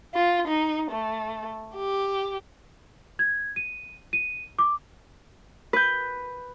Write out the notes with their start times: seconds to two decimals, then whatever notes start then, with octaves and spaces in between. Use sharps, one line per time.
0.14 F4
0.47 D#4
0.91 A3
1.76 G4
3.19 G#6
3.56 D#7
4.13 D#7
4.59 D6
5.73 B4 G6